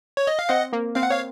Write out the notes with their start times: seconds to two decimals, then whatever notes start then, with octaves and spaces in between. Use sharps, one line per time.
0.17 C#5
0.27 D#5
0.39 F5
0.49 C4 D#5 F#5
0.73 A#3
0.95 C4 F5
1.03 F#5
1.11 C#5 F5